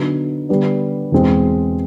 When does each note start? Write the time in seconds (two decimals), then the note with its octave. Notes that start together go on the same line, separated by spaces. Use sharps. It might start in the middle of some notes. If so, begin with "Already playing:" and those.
Already playing: D3 F#3 B3 D#4
0.49 D3 G3 B3 D4
1.12 E2 B2 G#3 C4